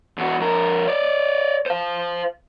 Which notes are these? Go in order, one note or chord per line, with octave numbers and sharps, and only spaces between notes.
E2 F#4
F2 A#4
C#5 D5
C5 F5